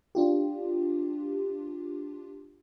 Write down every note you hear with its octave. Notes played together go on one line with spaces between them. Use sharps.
D4 F4 G4